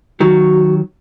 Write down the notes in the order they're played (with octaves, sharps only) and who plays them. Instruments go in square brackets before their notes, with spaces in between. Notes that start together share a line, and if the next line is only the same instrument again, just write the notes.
[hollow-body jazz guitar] D#3 F#3 [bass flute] F#4